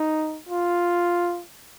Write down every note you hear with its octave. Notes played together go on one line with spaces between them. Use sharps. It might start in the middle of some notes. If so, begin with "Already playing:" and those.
Already playing: D#4
F4